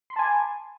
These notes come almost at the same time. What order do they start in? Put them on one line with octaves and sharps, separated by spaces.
C6 B5 A5 G#5 D6